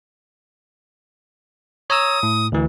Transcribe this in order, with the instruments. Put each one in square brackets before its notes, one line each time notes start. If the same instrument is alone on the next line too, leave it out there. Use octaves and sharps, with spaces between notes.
[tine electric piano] C#5 A#5 E6 [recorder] D#6
[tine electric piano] A2
D2 E3